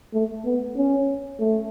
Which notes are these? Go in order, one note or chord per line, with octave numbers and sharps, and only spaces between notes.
A3
B3
C#4
A3